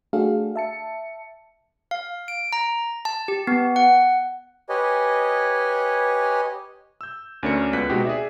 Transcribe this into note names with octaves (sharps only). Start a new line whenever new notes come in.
A3 D4 F#4 G#4 A4 F5
E5 A5 C#7
F5
D7
A#5
A5
G4
B3
F#5
G4 B4 C#5 D#5 G#5
E6 G6
D2 A3 C#4 D4 A#4 C#7
C#2 B3 F#6 B6
B2 G#3 C4 D#4 F#4 G4
G#4 D5 E5